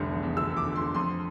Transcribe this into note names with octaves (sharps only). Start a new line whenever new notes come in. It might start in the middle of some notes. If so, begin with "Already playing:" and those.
Already playing: F1 C2 D3
E2
E2
D3 E6
E2
D6
D3
C6
D3
F2 C6